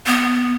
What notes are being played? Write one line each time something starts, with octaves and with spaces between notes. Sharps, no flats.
B3